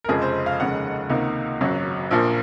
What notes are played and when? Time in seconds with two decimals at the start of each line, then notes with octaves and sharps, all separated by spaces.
0.04 A#4
0.08 F1 F2 C#3 F3 G#3 G#4
0.22 C5
0.46 F5
0.59 F1 D#2 C#3 G#3 F#5
1.10 C#2 C3 D#3 A#3
1.61 G#1 F#2 C#3 F#3
2.11 A#1 A#2 F3 A#3